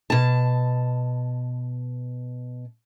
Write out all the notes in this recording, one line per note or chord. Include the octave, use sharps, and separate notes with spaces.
B2 A5